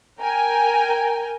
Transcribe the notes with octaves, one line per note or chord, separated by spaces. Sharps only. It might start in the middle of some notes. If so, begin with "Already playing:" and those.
A#4 G5 G#5